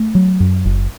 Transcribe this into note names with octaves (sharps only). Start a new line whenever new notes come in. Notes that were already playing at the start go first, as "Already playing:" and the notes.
Already playing: A3
F#3
F#2
F#1